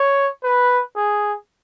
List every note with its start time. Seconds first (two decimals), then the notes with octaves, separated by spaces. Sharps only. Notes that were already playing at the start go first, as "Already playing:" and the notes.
Already playing: C#5
0.44 B4
0.96 G#4